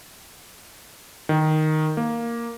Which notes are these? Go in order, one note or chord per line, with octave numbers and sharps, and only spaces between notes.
D#3
A#3